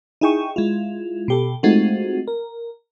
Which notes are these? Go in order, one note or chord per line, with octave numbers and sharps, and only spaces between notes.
D#4 E4 G#4 G5 C#6
G#3 E4 F4
B2 G4 A4
G#3 A3 C4 D#4 F4 F#4
A#4